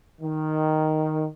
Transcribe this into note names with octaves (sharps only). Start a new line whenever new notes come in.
D#3